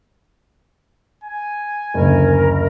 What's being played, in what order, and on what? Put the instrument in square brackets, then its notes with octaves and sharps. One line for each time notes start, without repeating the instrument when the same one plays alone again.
[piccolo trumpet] G#5
[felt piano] F#1 D2 [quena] A#4